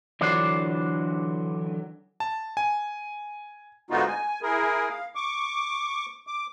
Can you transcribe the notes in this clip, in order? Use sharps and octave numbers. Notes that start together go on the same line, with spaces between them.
D3 E3 F#3 D4 C5 D5
A5
G#5
G#2 D3 B3 D#4 F4 F#4
G#5
E4 G#4 A#4
F5
C#6 D6
D6